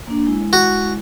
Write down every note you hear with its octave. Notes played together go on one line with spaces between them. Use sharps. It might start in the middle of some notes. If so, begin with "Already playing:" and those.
A#3 D4
G#3 E4
F#4